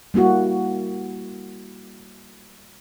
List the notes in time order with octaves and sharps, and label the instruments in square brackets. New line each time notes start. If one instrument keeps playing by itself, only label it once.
[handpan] G3 A#3 E4 F#4